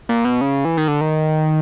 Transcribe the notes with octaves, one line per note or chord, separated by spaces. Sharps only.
A#2
B2
C#3
E3
D#3
D3
D#3